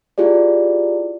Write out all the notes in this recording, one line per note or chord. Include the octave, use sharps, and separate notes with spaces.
E4 F4 G4 G#4 D5